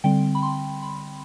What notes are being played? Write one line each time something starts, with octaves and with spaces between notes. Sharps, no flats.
D3 G3 C4 G5
B5
C6
B5